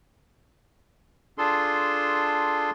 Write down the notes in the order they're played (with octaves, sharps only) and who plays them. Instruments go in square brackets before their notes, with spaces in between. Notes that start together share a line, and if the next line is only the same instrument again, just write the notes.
[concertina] D4 F4 G#4 A4 C6